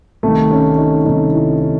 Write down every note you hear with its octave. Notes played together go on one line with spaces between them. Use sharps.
C2 C3 D#3 A3
C#4
D#4
C2 C3 D#3 D#4
E4
D#4